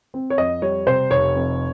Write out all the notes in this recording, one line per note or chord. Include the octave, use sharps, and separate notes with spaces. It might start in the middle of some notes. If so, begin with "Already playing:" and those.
C4
C#5
F2 D#5
G3 C#5
C3 C5
F1 C#5
F2